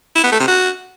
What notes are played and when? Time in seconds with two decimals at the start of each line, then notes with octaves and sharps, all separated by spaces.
0.16 E4
0.24 B3
0.32 A3
0.40 C3
0.48 F#4